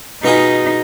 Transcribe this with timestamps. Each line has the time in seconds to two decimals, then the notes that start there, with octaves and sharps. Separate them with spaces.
0.23 B2 B3 D#4 F4 G#4